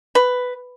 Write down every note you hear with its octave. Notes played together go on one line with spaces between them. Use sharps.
B4